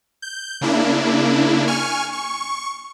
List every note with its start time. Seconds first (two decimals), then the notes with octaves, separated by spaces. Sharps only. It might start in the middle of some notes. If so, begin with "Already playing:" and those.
0.22 G6
0.61 C#3 A#3 D4 E4
1.67 G#5 C#6 F6
2.12 C#6